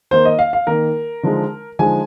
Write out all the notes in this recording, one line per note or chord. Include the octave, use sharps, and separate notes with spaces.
D#3 A#3 D#4 C5
D#5
F5
F5
D#3 A#3 D#4 A#4
D3 F3 G#3 D#4
D3 F3 G#3 D#4 G#5